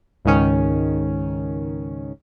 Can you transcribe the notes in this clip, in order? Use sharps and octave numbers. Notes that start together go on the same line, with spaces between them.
C#2 G#2 D#3 C#4